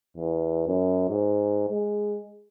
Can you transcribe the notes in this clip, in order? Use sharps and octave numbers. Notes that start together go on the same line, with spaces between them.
E2
F#2
G#2
G#3